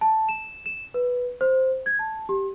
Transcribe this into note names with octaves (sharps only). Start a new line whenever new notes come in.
A5
E7
E7
B4
C5
G#6
A5
G4